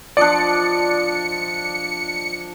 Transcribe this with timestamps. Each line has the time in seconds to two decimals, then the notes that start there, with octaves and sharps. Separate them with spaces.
0.17 F3 D4 D5 D#5 C#7